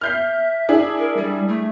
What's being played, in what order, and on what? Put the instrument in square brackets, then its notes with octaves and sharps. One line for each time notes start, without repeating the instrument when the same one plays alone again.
[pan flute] E5 [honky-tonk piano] F6 G6 C7
[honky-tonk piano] D4 E4 G#4
[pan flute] A#4
G3
A3